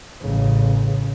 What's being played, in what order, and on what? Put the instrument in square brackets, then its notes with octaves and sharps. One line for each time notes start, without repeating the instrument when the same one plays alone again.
[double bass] A1 C#3